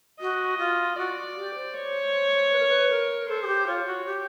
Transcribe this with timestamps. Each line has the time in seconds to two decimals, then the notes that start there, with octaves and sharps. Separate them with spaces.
0.20 F#4 D#5
0.58 F4
0.96 F#4 D5
1.36 G4
1.55 C5
1.74 C#5
2.52 B4
2.59 A#4
2.68 B4
2.90 A#4
3.28 A4 C5
3.42 G#4
3.47 G4
3.67 F4 C#5
3.86 F#4
4.06 G4